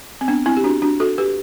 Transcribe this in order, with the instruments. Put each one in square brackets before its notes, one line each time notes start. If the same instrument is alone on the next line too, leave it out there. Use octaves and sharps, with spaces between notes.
[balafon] C4
B3 D4
C4 E4
G4
D4 F#4
D4 F#4
F#4 A4
G4 B4